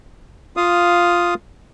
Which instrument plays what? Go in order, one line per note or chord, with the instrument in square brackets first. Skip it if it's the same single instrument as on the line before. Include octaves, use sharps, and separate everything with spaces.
[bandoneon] F4 F5 D#6